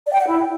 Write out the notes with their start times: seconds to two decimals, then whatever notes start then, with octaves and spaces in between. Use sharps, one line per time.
0.06 D5
0.13 G5
0.20 F#5
0.26 E4